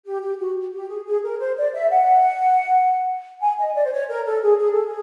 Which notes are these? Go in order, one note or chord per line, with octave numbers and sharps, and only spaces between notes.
G4
G4
F#4
G4
G#4
G#4
A#4
C5
D5
E5
F#5
G#5
D#5
D5
C5
C#5
A#4
A4
G#4
G#4
A4
G#4